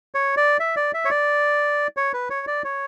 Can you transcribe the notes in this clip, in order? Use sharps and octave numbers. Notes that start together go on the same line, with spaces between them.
C#5
D5
E5
D5
E5
C#5
D5
C#5
B4
C#5
D5
C#5